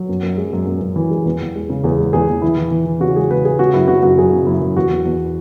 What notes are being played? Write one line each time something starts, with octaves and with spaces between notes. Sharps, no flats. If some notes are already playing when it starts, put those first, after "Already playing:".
Already playing: F#3
F#2
F#2
G#3
F#2
F#2
F#2
E3
G#3
E2
E2
G#3
C#3
E2 G#4
G#3
E2 G#4
E2
E3 E4
E3
E3
E3
C#3 F#4
G#3 G#4
C#3 B4
G#3 G#4
C#3 F#4
F#2 E4
C#3 F#4
F#2 F#4
F#2 G#4
C#3
F#2 E4
F#2
E2 F#4
E2
E2